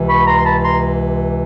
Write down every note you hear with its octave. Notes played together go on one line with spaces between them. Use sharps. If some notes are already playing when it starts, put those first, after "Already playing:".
Already playing: C#2 C3 E3
B5 C#6
A#5 C6
C6
A5 B5
A#5 C6